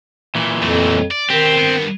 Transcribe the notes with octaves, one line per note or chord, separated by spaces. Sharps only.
A#2 E3
F2 F#3 A3
D5
B2 D#3 C4 G4
G2 B3